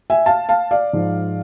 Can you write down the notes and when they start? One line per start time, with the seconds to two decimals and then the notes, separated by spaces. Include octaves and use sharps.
0.10 E5 G#5
0.26 F5 A5
0.49 F5 A5
0.71 D5 F5
0.93 G#2 F3